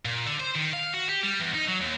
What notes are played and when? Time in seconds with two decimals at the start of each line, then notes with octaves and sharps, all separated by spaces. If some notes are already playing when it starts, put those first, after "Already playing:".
0.05 A#2
0.26 D3
0.40 C5
0.55 D#3
0.73 F5
0.94 F#4
1.09 G4
1.24 G3
1.40 E2
1.55 D#4
1.68 F#3
1.81 D#2